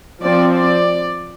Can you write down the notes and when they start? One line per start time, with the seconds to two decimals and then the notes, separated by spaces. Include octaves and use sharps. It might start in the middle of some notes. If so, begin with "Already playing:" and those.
0.23 F3 C4 D5
0.55 D5